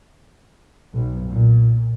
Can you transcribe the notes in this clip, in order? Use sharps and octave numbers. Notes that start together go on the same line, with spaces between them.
B1
A#2